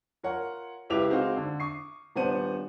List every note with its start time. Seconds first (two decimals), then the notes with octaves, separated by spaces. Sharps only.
0.23 F4 A#4 C#5 F#5
0.90 C#2 E4 G4 B4 D6 F7
1.10 G#3 C4 D#4 F#4 F5
1.37 D3
1.60 C#6 D#6 C7
2.16 D#1 B3 D4 C5 F#5 D#7